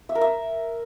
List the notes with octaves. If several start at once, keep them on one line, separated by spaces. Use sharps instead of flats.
E5
A#4
E5